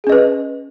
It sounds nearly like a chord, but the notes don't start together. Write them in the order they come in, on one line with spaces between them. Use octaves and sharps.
G#4 C#4 D#5 B4